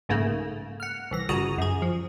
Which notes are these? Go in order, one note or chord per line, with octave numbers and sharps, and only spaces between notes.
B1 G#2 C#3 A3 A#3
F#5 F6
C2 E3 A#6
G1 C2 C#3 F#4 A#5 D#6
F#2 G#4
F3